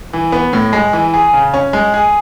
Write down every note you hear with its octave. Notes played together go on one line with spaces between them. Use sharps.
E3
B3
A2
G#3
E3
G#4
C#3
C#4
G#3
G#4